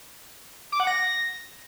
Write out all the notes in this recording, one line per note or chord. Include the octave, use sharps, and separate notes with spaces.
D6
F#5
A#6